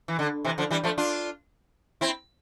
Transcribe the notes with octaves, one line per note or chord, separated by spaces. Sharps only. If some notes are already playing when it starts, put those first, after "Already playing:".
E3
D3
C3 E3
D3 F3
E3 G3
F3 A3
D4 F4
C4 E4